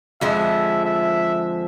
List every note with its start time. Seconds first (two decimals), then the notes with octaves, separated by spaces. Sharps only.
0.21 F2 D3 F3 G#3 E5
0.85 E5